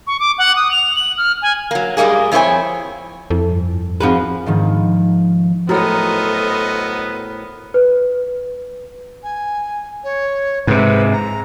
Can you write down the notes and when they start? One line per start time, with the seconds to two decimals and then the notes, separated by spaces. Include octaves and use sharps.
0.07 C#6
0.20 D6
0.38 F#5
0.56 D#6
0.71 F7
0.96 F#7
1.18 F6
1.42 G#5
1.71 F#3 A#3
1.97 A2 G3 G#3 A#3 G#4
2.32 F2 C4 E4 C5 C#5 G#5
3.30 F2 E4 A4
3.51 G2
4.01 F3 C4 D#4 F#4 G#4 B4
4.46 G#2 D#3 F3
5.69 A2 F#3 B3 A4 A#4 C5 D#5
7.74 B4
9.23 G#5
10.04 C#5
10.67 G#2 C3 B4
11.12 A#5